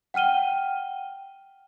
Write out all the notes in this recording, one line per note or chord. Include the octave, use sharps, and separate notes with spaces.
F#5 G5 F6 D#7 G7